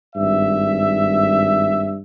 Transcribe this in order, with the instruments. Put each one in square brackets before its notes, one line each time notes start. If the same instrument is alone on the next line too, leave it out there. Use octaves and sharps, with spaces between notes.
[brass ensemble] G#1 G2 E5